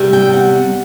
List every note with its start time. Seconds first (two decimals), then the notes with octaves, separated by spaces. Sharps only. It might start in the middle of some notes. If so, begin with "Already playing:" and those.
Already playing: E2 C3 G3
0.13 G5
0.33 F#5